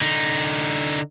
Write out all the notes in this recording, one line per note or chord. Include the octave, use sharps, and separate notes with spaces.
D3 D#4